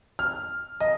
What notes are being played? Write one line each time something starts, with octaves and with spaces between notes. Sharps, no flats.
F6
D#5